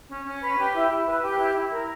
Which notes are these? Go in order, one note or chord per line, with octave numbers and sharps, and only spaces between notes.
C#4
C#4
B4
G4
E4
E4
B4
G4
E4
E4
A#4